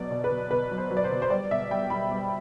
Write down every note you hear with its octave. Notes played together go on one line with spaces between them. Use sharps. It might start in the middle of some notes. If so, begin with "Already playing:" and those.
Already playing: B2 F#3 D5
B2
B4
B2
B2 B4
F#3
C5
F#3
D5
C5
B2
C5
G3 D5
B2 E5
G3 G5
G3 B5
G3